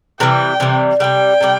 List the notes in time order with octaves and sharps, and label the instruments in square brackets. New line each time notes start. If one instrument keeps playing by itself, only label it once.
[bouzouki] C3 E3 G3 [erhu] G5
[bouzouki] C3 E3 G3
[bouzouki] C3 E3 G3 [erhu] G5
[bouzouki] C3 E3 G3